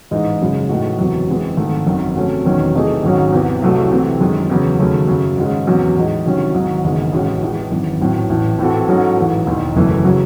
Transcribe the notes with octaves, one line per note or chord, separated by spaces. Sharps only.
A1 G#2 E3 G#3 D#4
F#2 C#3 G#3
A2 E3 A3 D#4 F#4
F#1 E2 C3 F#3
F#2 E3 G#3 C4
G#1 G#2 D#3 A3
G#1 F#2 D#3
C3 F#3 A3 C#4
E1 E2 D#3 F#3 C#4
C3 E3 A3 D#4 G#4
G#1 G#2 F#3 C#4
E2 C3 E3
C2 C3 F#3 A3
C3 E3 A3 C4
F#2 D#3 G#3
E2 C#3 F#3
D#2 C#3 F#3 A3 C#4
F#2 C#3 F#3
G#2 D#3 G#3 C#4
E2 C3 F#3 C#4
A2 E3 G#3 D#4
C2 C3 D#3 F#3 C#4
G#1 G#2 F#3
F#1 E2 D#3 G#3
A1 A2 G#3 C#4 F#4
A1 A2 E3 G#3
G#1 F#2 E3
A1 A2 F#3 C4
A1 A2 E3
A2 E3 C4 F#4 A4
G#2 F#3 C#4 F#4 A4
A1 G#2 E3
E1 D#2 D#3
F#1 F#2 E3 A3
C#3 F#3